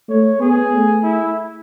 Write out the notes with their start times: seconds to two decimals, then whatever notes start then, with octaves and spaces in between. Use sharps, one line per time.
0.09 A3 C#5
0.40 B3 G#4
0.72 A3
1.03 E4